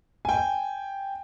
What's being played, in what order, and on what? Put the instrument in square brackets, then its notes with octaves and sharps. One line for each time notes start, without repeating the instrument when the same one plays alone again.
[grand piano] G5 G#5